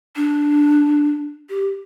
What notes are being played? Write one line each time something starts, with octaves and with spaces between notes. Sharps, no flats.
D4
G4